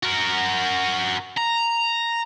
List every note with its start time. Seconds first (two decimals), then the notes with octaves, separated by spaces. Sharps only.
0.03 F#4 A#4
1.37 A#5